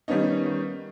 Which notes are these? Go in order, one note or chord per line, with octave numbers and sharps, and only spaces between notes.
D#3 G3 A#3 B3 C#4 D#4